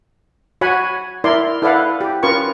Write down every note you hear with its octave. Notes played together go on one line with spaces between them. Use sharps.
F#4 C#5 F#5 G#5 B5
E4 A#4 D5 C6
E4 A4 B4 D5 F5 F#5
G4
C#4 F4 A#4 B4 C#6